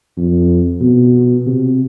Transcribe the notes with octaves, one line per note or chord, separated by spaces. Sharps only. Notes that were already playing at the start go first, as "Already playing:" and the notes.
F2
B2
C3